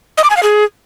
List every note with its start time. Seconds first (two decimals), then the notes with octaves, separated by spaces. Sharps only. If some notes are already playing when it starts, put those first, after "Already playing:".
0.18 D#5
0.24 D6
0.30 G#5
0.37 F5
0.43 G#4